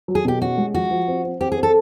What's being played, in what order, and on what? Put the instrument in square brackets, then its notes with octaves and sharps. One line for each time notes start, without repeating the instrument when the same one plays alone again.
[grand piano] F#3
[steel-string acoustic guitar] G#4
[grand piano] B2 [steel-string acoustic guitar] G4
[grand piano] C#4 [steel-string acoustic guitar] F#4
[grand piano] G#3
[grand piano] F3 [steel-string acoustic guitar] F#4
[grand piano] F3
C4
C4
[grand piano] C4 [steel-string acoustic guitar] G4
[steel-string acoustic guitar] G#4
[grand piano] C4
[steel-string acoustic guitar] A4